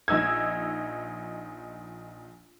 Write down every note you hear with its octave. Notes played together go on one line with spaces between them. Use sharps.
A#1 D#4 E6 G#6